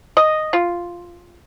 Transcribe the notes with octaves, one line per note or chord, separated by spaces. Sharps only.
D#5
F4